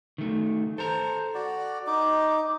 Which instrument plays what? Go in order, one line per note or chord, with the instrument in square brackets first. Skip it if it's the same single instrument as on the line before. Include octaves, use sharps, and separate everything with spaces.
[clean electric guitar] D#3 A3
[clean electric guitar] A4 A#5 [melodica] C5
[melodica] F#4 D5
[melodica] D#4 [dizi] D6